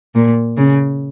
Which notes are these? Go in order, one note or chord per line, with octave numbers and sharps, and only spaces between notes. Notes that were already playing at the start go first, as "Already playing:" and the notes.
A#2
C#3